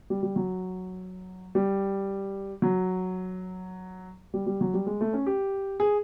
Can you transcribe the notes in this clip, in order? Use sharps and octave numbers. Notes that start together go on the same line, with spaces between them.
G3
G3
F#3
G3
F#3
G3
G3
F#3
G3
G#3
A3
C#4
G4
G#4